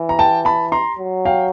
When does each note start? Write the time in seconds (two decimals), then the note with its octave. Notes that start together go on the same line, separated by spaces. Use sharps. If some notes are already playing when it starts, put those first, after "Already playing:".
Already playing: E3
0.09 A#5
0.19 G5 A5
0.45 A5 B5
0.72 A#5 C6
0.99 F#3
1.25 F5 G5